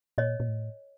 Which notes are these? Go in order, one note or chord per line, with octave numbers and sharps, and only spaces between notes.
A#2 C#5 D#5
A#2
A2